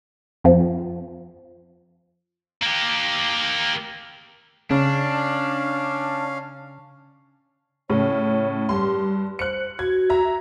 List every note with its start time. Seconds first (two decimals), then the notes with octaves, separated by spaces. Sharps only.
0.44 F2 F3
2.63 A#3 G4
4.71 C#3 C#4 D4 F5
7.90 A2 C#3 C#5
8.69 G2 G4 C6
9.39 C5 F#6 C#7
9.79 F#4 G#6
10.10 E5 A#5